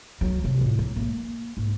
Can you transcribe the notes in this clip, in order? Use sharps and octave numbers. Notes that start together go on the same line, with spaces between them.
F#3
C3 F3
A2
F#3
A3 A#3
G#2